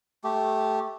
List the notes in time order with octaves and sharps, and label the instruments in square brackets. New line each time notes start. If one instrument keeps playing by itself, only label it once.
[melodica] A3 G4